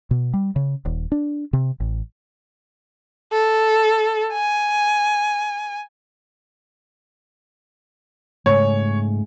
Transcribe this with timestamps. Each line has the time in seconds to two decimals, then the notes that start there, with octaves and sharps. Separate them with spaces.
0.11 B2
0.34 G3
0.56 C#3
0.85 D#1
1.12 D4
1.53 C3
1.80 A1
3.32 A4
4.33 G#5
8.46 G#2 C#3 A3 C#5